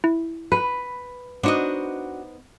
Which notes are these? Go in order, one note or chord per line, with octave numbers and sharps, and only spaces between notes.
E4
B4
B3 D4 D#4 F#4 C5 D#5